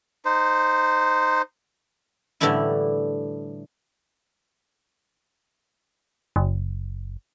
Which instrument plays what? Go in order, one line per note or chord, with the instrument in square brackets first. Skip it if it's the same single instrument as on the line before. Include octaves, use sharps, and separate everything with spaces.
[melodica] D#4 C5
[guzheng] A2 D3 E3 G3 D4 E4
[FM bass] F#1